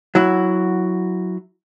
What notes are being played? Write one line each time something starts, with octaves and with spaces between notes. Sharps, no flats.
F#3 E4 F#4